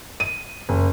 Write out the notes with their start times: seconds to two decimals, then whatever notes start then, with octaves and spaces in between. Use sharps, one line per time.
0.20 D#7
0.69 F#1